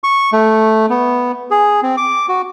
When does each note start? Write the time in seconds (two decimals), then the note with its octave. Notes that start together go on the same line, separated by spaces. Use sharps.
0.04 C#6
0.33 A3
0.90 B3
1.51 G#4
1.83 C4
1.97 D6
2.28 F#4